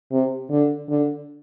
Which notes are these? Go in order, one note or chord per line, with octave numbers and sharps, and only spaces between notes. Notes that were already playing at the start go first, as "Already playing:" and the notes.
C3
D3
D3